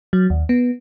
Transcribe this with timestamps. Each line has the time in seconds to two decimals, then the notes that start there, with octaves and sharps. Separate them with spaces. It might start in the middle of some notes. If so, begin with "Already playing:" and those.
0.13 F#3
0.30 D#2
0.49 B3